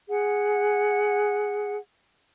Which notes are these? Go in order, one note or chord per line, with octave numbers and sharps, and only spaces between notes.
G#4 F#5